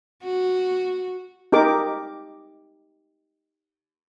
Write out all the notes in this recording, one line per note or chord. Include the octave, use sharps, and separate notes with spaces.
F#4
D#4 G4 A#4 D6